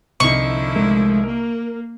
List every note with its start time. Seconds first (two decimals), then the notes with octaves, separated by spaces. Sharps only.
0.20 C2 D3 F3 D#4 E4 C#6
0.76 G#3 A3 A#4
1.24 A#3 A#4